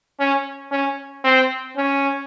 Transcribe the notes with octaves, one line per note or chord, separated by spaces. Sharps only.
C#4
C#4
C4
C#4